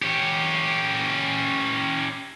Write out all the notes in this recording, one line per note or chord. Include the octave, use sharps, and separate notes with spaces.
C#4 G4